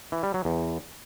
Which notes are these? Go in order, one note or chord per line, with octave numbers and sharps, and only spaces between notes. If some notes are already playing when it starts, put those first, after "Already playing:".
E3
G3
F#3
E2